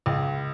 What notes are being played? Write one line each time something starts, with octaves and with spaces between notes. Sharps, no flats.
C#2